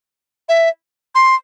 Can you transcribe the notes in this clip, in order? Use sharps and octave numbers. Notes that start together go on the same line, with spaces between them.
E5
C6